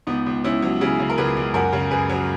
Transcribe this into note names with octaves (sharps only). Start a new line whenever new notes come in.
C#2 B3 D#4
C#2
C#2 C#4 E4
F#3
C#3 E4 G#4
C#3
A#4
C#2 G#4 B4
C#2
F#2 F#4 A#4
C#3
F#2 G#4 B4
F#3